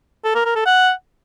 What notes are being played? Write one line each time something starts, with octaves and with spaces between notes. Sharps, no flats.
A4
A#4
A#4
A4
F#5